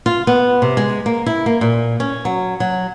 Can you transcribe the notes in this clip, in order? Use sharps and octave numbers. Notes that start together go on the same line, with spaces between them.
F4
B3
C3
G#3
A#3
E4
A#3
A#2
C#4
F#3
F#3